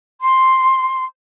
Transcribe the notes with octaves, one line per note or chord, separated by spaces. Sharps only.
C6